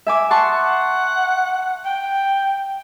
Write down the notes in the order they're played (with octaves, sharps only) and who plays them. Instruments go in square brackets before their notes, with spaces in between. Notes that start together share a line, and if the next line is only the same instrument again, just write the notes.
[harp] E5 G#5 D6
[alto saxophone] F#5 [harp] A5 C6 C#6
[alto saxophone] G5